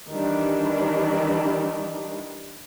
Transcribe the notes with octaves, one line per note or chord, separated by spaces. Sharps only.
D#3 E3 G3 D4